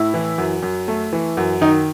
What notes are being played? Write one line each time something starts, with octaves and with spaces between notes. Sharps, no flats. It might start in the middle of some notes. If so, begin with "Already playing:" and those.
Already playing: A2 E4
E3
F#2
F#2
A3
E3
F#2
D#3 D#4